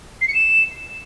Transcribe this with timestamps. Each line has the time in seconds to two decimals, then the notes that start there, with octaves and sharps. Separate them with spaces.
0.21 C7
0.27 C#7
0.34 E7